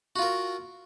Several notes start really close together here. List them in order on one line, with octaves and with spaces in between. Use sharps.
F#4 F4 A#4